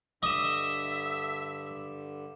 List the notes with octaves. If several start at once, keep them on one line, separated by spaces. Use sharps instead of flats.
G2 D3 D#5 E5 D6 E7